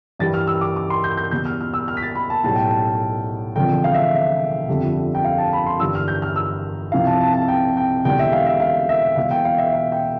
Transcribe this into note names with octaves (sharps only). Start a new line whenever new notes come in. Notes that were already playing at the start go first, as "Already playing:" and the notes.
G2 E3 G3 A6
F6
E6
D6
D6
C6
G6
G6
E2 B2 G3 G6
F6
F6
E6
F6
B6
A6
B5
A5
B1 A2 G3 A5
G5
A5
E1 D2 D3 F3 C4 G5
F5
E5
E5
G1 F2 D3 G3
G5
F5
A5
B5
C6
G1 G2 E3 G3 D4 E6
F6
G6
F6
E6
C2 C3 F3 C4 F5
A5
A5
A5
G5
G5
E1 E2 D3 G3 G5
E5
F5
E5
F5
E5
E1 E2 B2 F5
G5
F5
E5
F5
G5